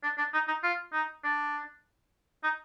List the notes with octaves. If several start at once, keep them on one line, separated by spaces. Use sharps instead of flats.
D4
D4
D#4
D#4
F4
D#4
D4
D#4